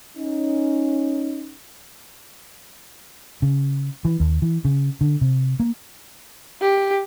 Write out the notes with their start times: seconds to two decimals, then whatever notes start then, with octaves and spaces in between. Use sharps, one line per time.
0.17 C#4 D#4
3.42 C#3
4.05 E3
4.20 D#2
4.42 E3
4.65 C#3
5.01 D3
5.21 C3
5.60 A#3
6.61 G4